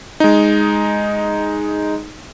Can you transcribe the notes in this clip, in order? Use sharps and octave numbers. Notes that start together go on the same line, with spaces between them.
G#3 D#4